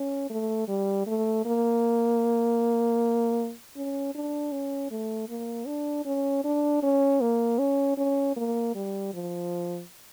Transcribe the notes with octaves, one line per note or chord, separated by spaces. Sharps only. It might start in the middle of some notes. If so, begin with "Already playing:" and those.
Already playing: C#4
A3
G3
A3
A#3
C#4
D4
C#4
A3
A#3
D4
C#4
D4
C#4
A#3
C#4
C#4
A#3
G3
F3